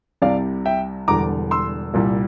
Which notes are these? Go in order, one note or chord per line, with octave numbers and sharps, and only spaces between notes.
C2 C3 G3 D5 F5
E5 G5
E1 E2 D3 G3 A#5 D6
C6 E6
C2 A#2 G3